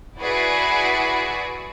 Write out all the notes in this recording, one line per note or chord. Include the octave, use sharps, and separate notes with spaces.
E4 F#4 G#4 B4 D5